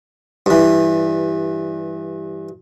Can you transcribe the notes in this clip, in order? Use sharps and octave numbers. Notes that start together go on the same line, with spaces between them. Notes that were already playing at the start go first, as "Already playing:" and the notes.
G2 E3